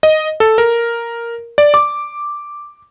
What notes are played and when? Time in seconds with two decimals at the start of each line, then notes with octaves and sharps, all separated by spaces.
0.03 D#5
0.40 A4
0.58 A#4
1.58 D5
1.74 D6